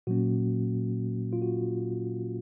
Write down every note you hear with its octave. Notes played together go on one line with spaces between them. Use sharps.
A#2 F#3 A#3 C#4 F#4
F4
F#4